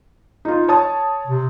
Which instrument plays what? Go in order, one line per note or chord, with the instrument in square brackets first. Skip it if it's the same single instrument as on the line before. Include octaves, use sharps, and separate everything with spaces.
[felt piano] D#4 F4
C#5 A5 D#6
[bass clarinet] C3